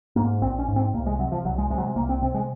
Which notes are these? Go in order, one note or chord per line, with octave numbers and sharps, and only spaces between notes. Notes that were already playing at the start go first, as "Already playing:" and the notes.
G#2 A#3
A#1 C4
C#4
G#2
C4
C2 A#3
G#3
C3 F#3
F3
C2 F#3
G#3
C3 G#3
F#3
G#3
C2 A#3
C4
C3 C4
G#3